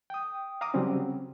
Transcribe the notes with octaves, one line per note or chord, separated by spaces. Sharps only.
G5 D#6
F5 A#5 D6 D#6
C#3 F#3 G3 C4 C#4